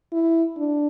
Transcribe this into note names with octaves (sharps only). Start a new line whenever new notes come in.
E4
D4